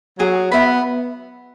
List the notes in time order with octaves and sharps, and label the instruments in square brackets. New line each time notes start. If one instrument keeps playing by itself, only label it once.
[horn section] F#3 [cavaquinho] G#4
[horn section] B3 [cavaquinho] E5 B5